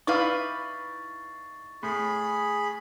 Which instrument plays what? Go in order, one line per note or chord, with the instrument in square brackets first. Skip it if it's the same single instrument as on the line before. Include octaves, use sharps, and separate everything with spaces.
[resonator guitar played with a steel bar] D#4 E4 B4 [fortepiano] D5 F5 D6 [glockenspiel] C#6 A6
[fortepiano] A2 [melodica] G#4 B5